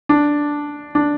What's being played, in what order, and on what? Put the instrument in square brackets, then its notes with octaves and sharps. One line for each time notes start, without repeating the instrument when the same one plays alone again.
[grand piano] D4
D4